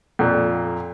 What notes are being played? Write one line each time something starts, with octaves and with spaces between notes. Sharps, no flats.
F2 A#2